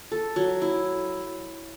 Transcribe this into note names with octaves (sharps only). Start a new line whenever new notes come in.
A4
F#3
E4